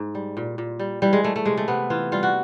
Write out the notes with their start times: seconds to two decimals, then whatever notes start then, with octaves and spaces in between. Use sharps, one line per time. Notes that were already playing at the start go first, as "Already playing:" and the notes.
Already playing: G#2
0.15 G3
0.37 A#2
0.58 A#2
0.79 G3
1.02 E3 G3
1.13 G#3
1.23 G3 A3
1.36 A3
1.45 C3 G#3
1.57 A3
1.68 C3 B3
1.90 E3 F4
2.12 G3 F4
2.23 F#4